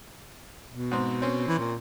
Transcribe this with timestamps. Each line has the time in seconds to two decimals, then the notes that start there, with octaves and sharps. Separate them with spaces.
0.71 B2
0.91 G#2 C4
1.22 C4 C#4
1.47 E3
1.59 A#2